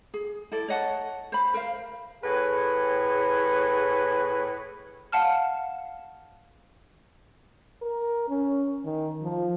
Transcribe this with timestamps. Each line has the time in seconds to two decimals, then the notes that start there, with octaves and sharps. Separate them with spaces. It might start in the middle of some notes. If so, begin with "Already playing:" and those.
0.14 G#4
0.52 E4 A4 D5
0.68 C#5 D#5 F#5 A5
1.32 C5 B5
1.54 A#4 C5 F5
2.24 A2 G#4 B4 C#5
5.12 F5 F#5 A5 F6
7.82 A#4
8.29 C#4
8.86 D#3
9.23 F3